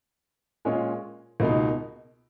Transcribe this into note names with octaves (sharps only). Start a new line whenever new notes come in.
A#2 G#3 C#4 F4
C#2 B2 A#3 D#4